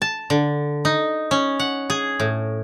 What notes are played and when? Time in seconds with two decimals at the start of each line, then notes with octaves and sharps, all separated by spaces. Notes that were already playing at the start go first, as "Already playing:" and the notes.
0.02 A5
0.30 D3
0.85 D#4
1.31 C#4
1.60 F#5
1.90 G#4
2.20 A2